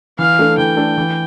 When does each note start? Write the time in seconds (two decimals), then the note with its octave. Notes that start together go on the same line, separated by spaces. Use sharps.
0.18 E3 F5
0.39 A3 D4 A4
0.58 E3 G5
0.77 A3 D4 A4
0.97 E3